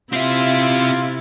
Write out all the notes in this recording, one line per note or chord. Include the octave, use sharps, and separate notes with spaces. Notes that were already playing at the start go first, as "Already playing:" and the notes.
C3 C4 E4 F4 E5